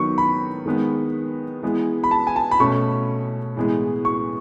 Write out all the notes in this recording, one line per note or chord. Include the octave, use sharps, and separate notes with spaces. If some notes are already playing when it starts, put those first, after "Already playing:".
Already playing: D#3 F#3 B3 C#6
B5
D#3 G#3 B3
E3 G#3 B3
B5
A5
G#5
A5
B5
B2 A3 C#4 C#6
A2 E3 G#3 B3
C#6